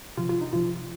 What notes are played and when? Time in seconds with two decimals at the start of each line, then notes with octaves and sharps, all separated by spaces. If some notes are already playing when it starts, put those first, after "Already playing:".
0.17 C3 F3 F4
0.29 F4
0.41 D#4
0.53 C3 F3 F4